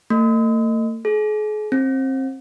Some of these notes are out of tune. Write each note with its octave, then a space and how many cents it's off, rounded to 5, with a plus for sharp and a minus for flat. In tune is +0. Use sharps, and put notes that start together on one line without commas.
A3 +45
G#4 +40
C4 +25